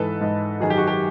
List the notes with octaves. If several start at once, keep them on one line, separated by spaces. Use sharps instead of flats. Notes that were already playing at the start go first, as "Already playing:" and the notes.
Already playing: G#2 E3 A4 B4
G#2 E3
F#2 D#3 F#3 G#4
G4
F#4
G4